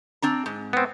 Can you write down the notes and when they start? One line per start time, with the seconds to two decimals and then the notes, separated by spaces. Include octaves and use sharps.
0.22 C4 D4 A#5
0.46 G#2
0.73 B3 C4